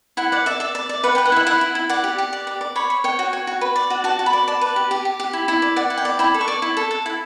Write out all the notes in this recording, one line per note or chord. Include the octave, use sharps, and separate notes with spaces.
E4 F#5
D5 F#5
D5 E5
D5 E5
D5
D5
B4 F#5
B4 G5
F#5
E4 E5
E4 F#5
E4
E4
D5 F#5
G4
G4
D5
D5
D5
C#5 B5
C#5
C#5 G5
F#4
C#5
F#4
B4
D5
F#4
F#4 A5
F#4
B5
D5
D5 A5
B4
G4
G4
G4
G4
E4
E4
D5
D5 F#5
E4
G5
D5
E4 B5
A4
C#6
D5
E4
A4
A4
E4